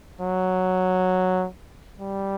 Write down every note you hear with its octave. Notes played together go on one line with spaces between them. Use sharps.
F#3
G3